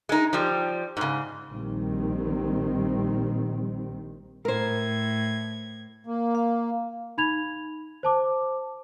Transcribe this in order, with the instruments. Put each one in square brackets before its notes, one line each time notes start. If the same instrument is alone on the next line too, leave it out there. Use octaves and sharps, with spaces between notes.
[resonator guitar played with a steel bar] G#3 D#4
F3 G3
G#2 C#3
[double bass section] A#1 D#3 G3 C4
[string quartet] A2 G#6 [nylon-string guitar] A#4 C5
[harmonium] A#3
[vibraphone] F5
[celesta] D#4 B5 G#6 F7
C5 A5 D6